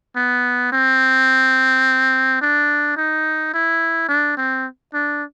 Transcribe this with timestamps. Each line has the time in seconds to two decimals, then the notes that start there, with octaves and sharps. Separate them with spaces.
0.16 B3
0.72 C4
2.41 D4
2.97 D#4
3.54 E4
4.09 D4
4.37 C4
4.94 D4